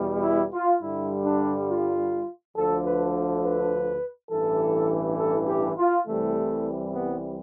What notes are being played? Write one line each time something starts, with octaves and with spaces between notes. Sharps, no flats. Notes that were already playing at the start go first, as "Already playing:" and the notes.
Already playing: E2 B2 G3
E4
F4
G2 D3 G3 E4
D4
F4
D2 D3 F3 A4
B4
B4
A1 G2 E3 A4
A4
G4
F4
C2 C3 E3 G3 A3
B3